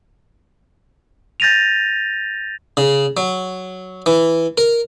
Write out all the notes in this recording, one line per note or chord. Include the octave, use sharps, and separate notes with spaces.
G6 A6 A#6 D#7 F7
C#3
F#3
E3
A#4